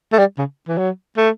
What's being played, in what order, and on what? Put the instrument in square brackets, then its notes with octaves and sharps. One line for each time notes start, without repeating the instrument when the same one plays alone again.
[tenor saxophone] A3
G3
C#3
E3
F#3
A3